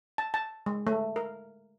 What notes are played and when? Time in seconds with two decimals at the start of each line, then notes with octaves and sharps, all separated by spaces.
0.18 A5
0.34 A5
0.66 G#3
0.87 A3
1.16 A#4